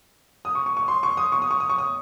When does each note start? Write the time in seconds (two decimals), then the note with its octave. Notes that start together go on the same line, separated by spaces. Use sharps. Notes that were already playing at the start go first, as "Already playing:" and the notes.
0.45 D#6
0.55 C#6
0.66 C#6
0.77 C#6
0.88 C6
1.03 C#6
1.17 D#6
1.32 C#6
1.42 D#6
1.51 C#6
1.60 D#6
1.70 C#6
1.78 D#6